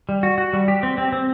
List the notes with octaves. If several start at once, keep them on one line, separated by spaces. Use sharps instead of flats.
G3
F#4
F#4
G3
G4
C4
C4
C4